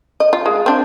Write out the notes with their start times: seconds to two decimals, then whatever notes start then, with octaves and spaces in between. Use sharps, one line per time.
0.20 D#5
0.33 F4
0.46 G#3
0.66 C4 D4